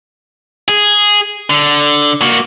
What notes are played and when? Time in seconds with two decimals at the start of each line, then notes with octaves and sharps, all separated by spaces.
0.68 G#4
1.50 D3
2.22 A#3 F#4